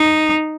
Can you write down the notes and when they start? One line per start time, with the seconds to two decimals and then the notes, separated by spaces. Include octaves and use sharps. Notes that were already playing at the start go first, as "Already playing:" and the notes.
Already playing: D#4